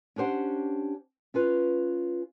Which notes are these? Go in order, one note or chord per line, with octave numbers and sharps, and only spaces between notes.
C#4 D4 G4 C5 F#5
C#4 F4 B4